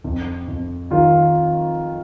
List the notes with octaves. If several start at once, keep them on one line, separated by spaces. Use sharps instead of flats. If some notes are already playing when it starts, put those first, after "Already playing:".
F2
F2
D#3 F4